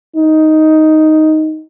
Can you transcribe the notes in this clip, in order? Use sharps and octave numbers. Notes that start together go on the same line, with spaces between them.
D#4